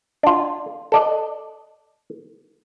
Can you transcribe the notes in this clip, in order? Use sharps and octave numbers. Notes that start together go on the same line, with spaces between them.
D4 F4
A4 D5 D#5